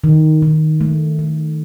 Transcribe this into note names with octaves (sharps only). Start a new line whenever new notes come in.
D#3
D#3
A3
A3